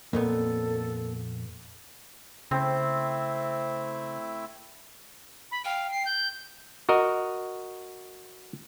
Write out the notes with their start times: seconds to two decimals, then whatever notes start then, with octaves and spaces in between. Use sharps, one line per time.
0.13 F2 A#2 A#3 B3 A4
2.51 C#3 A3 C4 E4 E5
5.51 B5
5.65 F5 G5
5.91 C7
6.06 G6
6.89 F#4 A#4 D#5